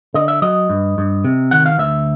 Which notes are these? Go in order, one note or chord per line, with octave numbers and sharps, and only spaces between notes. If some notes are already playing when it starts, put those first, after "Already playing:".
D3 D#5
E5
F#3 D#5
G2
G2
C3
D#3 F#5
F5
D2 E5